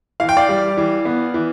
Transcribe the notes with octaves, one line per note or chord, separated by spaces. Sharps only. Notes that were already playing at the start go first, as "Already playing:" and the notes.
E3 F5
G5
D5 F5
G3
E3
B3
E3